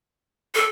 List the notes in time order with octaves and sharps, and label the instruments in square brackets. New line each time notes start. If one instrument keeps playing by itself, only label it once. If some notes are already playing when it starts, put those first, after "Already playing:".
[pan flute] A4